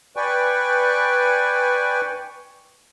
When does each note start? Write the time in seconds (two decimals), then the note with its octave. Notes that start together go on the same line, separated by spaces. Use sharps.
0.16 B4 D5 G5 G#5 C#6